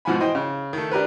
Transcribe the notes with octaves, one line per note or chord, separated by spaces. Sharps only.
G#2 B2 F3 F#5 G#5 B5
E3 C5 D#5 G5
C#3
D#3 A3
D4 G4 A#4 B4